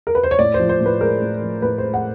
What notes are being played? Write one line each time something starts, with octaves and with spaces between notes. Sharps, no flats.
A#4
B4
C5
C#5
A2 D5
C5
F3
C5
A2
B4
G#3 A#4
A2
F3
A2 B4
G#3 C5
F#5